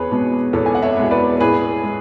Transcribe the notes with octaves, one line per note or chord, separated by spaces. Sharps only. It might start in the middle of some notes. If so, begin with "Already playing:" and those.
Already playing: E2 G#4 B4 C#5
B2 G#3 B3
E2 A4 C#5
G#5
F#5
C#5 E5
B2 G#3 B3
B4 D5
A2 G#4 B4
G#3